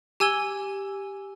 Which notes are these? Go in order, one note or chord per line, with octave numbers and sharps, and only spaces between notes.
G4 G#5 E6 G#6 G7